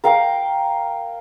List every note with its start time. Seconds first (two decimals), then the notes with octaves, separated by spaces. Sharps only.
0.04 A#4 F5 G5